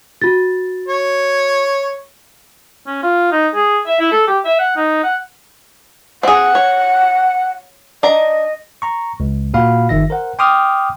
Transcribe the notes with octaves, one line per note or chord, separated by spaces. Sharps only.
F#4 A6
C#5
C#4
F4
D#4
G#4
E5
E4
A4
G4
E5
F#5
D#4
F#5
C4 G#4 F#5
C#5
D4 D#5 A#5
A#5 C#6
C#2
A#2 F#4 F5 B5
G1 D#3 E5 A#6
A#4 C5 F#5
G5 C6 D6 D#6 F6